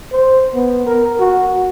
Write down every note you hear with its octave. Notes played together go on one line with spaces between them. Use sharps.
C5
B3
A#4
F#4